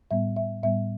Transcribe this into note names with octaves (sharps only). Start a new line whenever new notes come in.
A2 G3 B3 E5
E5
A2 G3 B3 E5